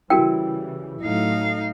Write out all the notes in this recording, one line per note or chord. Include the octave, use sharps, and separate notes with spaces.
C#3 E3 G3 E4 F#4 A#4 G5
A2 F#3 A3 D#4 F5